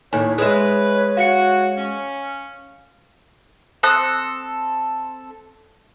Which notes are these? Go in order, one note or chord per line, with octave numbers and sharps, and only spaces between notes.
D#2 A2 C#5 G#5
G#3 B4 C#5 E5
F#4 F5 C#7
C#4
C4 A4 D#6 F#6